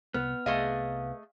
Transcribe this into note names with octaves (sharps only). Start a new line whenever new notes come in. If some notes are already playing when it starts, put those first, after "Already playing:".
C2 B3 F6
C2 A3 G#4 D#5 F5